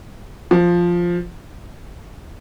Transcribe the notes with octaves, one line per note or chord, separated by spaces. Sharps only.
F3